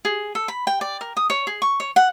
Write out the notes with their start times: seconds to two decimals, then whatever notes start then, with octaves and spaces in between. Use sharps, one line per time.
0.05 G#4
0.35 A4
0.48 B5
0.67 G5
0.81 D5
1.01 A#4
1.17 D#6
1.30 C#5
1.47 G#4
1.62 C#6
1.80 C#5
1.96 F#5